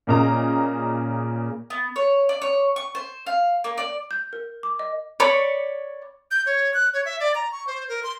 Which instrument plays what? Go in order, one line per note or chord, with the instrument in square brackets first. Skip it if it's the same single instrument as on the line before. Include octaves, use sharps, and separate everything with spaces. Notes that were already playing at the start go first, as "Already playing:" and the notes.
[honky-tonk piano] A#2 C#3 A#3 D#5 A#5
[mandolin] B3
C#5
D5
C#5
C#6
C5
F5
A#3
D5
[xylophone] G6
A#4
D6
D#5
[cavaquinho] C#5 D5 B5 C#6
[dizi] G6
C#5
F#6
C#5
E5
D5
A#5
C#6
C5
A#4
C6